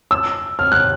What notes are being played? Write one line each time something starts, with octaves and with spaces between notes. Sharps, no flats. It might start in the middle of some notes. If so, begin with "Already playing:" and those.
E6
F6
F#6